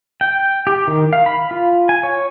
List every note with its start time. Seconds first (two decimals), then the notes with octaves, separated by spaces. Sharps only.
0.21 G5
0.67 G4
0.88 D#3
1.13 F5
1.26 B5
1.51 F4
1.89 G#5
2.03 C#5